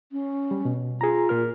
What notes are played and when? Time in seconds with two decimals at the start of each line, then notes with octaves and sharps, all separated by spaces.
0.12 C#4
0.51 G3
0.65 B2
1.01 F4 G#4 A#5
1.29 A#2 A#4 F6